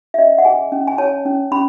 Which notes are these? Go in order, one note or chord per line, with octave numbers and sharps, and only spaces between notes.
E5
C#4 D#5
F#5
G#4 G#5
C#4
G#5
C#5 A5
C#4
C#4 B5